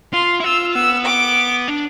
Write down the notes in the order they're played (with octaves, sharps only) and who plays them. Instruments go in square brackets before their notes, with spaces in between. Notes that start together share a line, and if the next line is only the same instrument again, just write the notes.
[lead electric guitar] F4 [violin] C6
[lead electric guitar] E4
[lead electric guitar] F4 [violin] E6
[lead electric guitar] B3 [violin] E6
[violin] D6
[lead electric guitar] D4